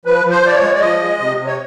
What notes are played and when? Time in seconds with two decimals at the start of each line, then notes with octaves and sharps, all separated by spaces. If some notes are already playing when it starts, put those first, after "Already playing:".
0.05 F3 B4
0.25 F3
0.30 C5
0.42 F3 D5
0.55 C#5
0.62 G#3
0.75 D5
0.80 F3 D#5
1.00 G#3
1.19 C3
1.37 C3
1.47 C#5